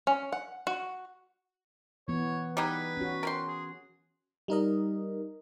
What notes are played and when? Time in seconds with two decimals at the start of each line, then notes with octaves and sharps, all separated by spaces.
0.07 C#4
0.32 F#5
0.67 F#4
2.08 E3 B3 C#5
2.57 G3 D#4 G#4 B4
2.97 C#4 F#4
3.23 A#4 G5 C6
3.48 G#4
4.48 G3 D#4 A#4 D#5